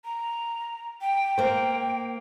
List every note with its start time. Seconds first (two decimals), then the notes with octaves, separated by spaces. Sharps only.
0.05 A#5
1.01 G5
1.38 A#3 C5